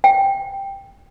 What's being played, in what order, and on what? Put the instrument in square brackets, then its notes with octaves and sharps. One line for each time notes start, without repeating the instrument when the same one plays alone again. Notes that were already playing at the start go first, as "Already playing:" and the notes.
[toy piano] G5